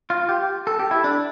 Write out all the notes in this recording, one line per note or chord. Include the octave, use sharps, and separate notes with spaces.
F4
G4
A4
G4
E4
D4